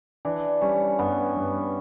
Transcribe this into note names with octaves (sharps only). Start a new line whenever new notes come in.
E3 D4
G3 C#4
G2 B3
G2